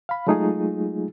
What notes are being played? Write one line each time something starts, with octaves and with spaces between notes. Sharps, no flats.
F5 B5
F#3 G#3 A3 D#4 F4 G#4